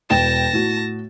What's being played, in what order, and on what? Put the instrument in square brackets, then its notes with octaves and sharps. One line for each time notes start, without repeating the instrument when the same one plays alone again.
[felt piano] E1 G5 E7 [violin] A5 A#6
[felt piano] A2 F#4